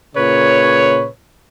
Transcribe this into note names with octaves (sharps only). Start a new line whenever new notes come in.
A#2 C#3 B4 C#5